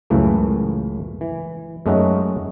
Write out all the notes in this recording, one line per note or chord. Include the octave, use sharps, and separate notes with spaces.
C#2 F#2 A2 E3 A3 A#3
E3
F#2 G#3 A3 C#4 D#4 F#4